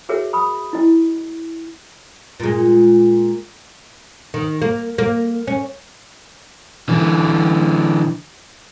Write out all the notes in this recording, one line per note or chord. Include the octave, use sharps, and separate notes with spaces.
F#4 G#4 A#4 C#5 E5
B5 D#6
E4 D#5
A#2 G#3
D#3
A#3
A#3
C#4
D3 E3